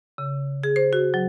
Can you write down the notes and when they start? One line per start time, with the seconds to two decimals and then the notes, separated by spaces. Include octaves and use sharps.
0.18 C#3
0.64 G#4
0.76 C5
0.93 F#4
1.14 F#3